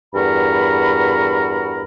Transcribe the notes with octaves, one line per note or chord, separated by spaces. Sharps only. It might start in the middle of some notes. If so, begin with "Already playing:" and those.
E2 G2 F#4 A#4 B5